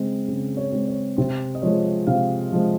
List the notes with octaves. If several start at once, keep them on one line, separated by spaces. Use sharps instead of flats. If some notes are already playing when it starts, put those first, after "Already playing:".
Already playing: C#3 G#3 C4
C#3
C#5
G#3 C4
C#5
C3 C5
D#5
F3 G#3 C#5
C3 F5
F3 G#3